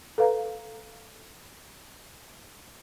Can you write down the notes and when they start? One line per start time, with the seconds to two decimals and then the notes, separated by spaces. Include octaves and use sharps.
0.18 A4 B4 F5 A#5